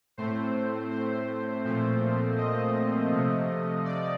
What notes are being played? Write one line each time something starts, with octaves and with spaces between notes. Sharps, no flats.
A2 A3 C4 C5
C5
A#2 F3 A3 C4 C5
D#5
C3 F3 A3
D5